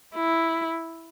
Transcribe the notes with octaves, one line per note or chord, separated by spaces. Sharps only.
E4